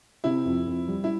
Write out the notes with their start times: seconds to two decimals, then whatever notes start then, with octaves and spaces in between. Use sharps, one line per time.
0.24 C3 E4
0.45 F2
0.67 F2
0.88 G3
1.04 E4